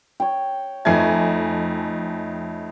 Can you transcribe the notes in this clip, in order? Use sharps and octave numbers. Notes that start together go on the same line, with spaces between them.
C#5 G5
F2 A3 D#4 G#5 G#6